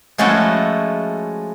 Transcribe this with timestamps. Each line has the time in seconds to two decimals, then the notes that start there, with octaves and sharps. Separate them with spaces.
0.18 F3 G#3 A3 C#4 E4 F#4